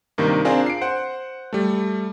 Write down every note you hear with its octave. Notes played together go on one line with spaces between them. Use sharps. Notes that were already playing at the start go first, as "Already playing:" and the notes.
G2 C3 D#3 A#3
C4 D4 F4 G#4 A#4
C7 D7
C5 F#5
G3 A3